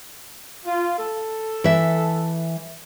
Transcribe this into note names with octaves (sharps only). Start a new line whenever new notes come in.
F4
A4
E3 E5